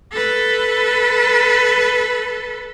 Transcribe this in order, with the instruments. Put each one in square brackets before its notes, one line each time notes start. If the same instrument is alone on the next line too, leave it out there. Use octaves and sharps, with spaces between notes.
[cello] A4 B4